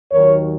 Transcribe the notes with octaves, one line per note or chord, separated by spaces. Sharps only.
D#2 D#3 F#3 A#4 C#5